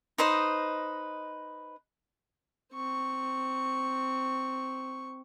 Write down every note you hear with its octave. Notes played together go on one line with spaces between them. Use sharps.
D#4 B4 C5 D#5
C4 C#6